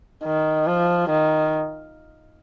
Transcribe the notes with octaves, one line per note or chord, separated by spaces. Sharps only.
D#3
F3
D#3